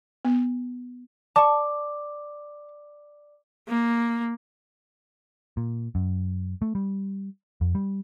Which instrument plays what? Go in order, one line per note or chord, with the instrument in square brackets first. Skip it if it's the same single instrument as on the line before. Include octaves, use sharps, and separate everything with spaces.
[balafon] B3
[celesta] D5 D6 [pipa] A5 C#6
[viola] A#3
[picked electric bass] A#2
F#2
A3
G3
F2
G3